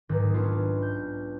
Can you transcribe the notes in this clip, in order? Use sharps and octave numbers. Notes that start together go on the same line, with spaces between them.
B1 G#2 D#3
B3 C#4 D4 E4 F4
G6